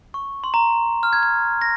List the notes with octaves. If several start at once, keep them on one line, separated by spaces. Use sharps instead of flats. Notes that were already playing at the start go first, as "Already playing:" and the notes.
C#6
C6
A#5
F6
G#6
G#6
A#6